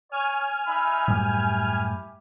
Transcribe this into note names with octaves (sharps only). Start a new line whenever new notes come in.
C#5 G#5 F6
D#4 E5 B5
F#2 A2 G3 E4 G4